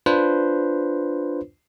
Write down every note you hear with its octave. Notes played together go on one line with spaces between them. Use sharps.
D4 F4 B4 C5